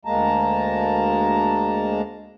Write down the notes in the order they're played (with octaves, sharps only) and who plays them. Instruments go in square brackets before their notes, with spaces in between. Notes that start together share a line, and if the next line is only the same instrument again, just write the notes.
[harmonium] D2 G#3 A#3 A5 A#5